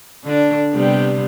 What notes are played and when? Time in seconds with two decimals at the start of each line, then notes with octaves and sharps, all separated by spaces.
0.24 D3 D4
0.73 C3 G3 B3